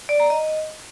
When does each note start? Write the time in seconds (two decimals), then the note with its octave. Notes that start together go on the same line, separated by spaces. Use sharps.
0.09 D5
0.20 A#5
0.30 D#5